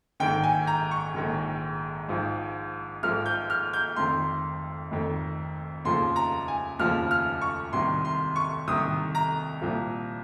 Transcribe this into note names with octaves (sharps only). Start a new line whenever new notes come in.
A#1 G#2 D#3 G5
G#5
A#5
C#6
A#1 G#2 D#3
G#1 G#2 F3
G#1 G#2 F3 F6
G6
F6
G6
F1 F2 D#3 C6
F1 F2 D#3
F1 D#2 C#3 F3 C6
A#5
G#5
F1 D#2 C#3 F3 F6
F6
C#6
C2 C3 D#3 C6
C6
C#6
C2 C3 D#3 D#6
A#5
C2 A#2 F3